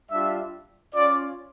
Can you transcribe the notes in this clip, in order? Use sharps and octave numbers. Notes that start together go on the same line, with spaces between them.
G3 D4 F4 E5
C#4 F4 D5